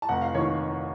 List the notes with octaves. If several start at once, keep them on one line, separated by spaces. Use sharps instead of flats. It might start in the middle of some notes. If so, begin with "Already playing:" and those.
A5
F1 F#5
F5
D#2 D#3 C#5